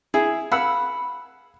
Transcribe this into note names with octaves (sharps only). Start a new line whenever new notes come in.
E4 G#4
F5 F#5 B5 E6